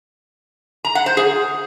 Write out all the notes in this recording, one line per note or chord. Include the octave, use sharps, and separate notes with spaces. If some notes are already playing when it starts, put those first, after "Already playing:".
A#5
F#5
C5
G#4